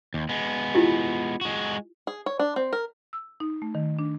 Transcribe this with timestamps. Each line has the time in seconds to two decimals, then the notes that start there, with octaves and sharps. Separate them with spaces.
0.14 D#2
0.29 G#3 B3
0.75 E4 F4 G4
1.41 G#3 F#4
2.07 G#4
2.26 C#5
2.39 D4
2.56 C4
2.73 A#4
3.13 E6
3.40 D#4
3.62 A3
3.75 D#3
3.99 D4